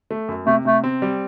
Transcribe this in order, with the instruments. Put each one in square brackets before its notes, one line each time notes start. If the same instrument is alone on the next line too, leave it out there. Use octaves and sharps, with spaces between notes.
[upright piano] A3
F#2
[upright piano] C3 [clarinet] A3
[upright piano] C3 [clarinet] A3
[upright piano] C4
G3